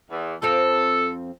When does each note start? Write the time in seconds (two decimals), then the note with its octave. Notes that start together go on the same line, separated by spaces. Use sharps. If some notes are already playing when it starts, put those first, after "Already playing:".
0.11 E2
0.42 F2 C4 A4 F5